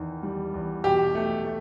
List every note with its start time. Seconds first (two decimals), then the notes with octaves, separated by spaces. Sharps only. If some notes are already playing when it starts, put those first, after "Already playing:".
Already playing: E2 D#3
0.23 G3
0.54 E2
0.84 B2 G4
1.15 A3
1.45 A3